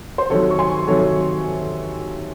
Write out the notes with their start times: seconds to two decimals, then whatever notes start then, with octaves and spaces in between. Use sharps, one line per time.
0.18 C5
0.30 C3 D#3 F#3 A4 C#5
0.51 C#6
0.59 G#5 C6
0.88 C3 D#3 F#3 A4 C#5